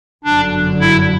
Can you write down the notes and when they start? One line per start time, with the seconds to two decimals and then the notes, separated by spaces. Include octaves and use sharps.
0.24 G1 F#2 D3 F#3 D4
0.80 E4